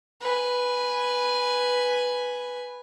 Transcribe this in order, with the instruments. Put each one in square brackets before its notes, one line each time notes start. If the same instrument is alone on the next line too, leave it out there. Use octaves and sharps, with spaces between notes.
[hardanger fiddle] B4 G#5